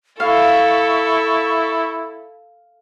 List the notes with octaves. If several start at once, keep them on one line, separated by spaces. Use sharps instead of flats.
E4 A4 F5 C#6